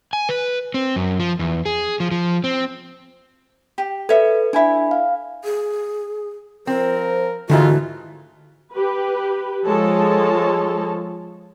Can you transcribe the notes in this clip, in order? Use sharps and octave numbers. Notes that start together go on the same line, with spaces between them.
G#5
B4
C4
F#2
F3
E2
G#4
F3
F3
C4
G4
A4 B4 C#5 E5
D4 E4 E5 G#5 B5
F5
G#4
F3 C4 A#4 C5
G#2 D3 E3 G#3 A3 F4 F#4
G4 B4
F3 G#3 A4 C#5 A5